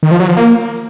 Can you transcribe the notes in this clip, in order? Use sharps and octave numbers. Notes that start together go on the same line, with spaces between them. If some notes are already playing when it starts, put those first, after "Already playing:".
D#3
F3
F#3
F3
A#3